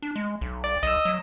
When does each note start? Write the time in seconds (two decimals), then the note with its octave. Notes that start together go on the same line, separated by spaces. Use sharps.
0.02 D4
0.16 G#3
0.41 B1
0.64 D5
0.83 B1 D#5 E6
1.05 F#3